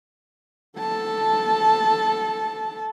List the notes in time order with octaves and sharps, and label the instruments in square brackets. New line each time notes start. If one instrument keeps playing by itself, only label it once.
[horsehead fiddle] A4 A5